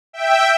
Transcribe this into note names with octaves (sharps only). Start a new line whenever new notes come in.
E5 G5